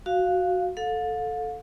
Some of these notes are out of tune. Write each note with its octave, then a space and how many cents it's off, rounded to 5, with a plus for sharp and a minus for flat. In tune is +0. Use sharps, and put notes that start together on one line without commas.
F#4 +0 F5 +0
A4 +0 F5 +40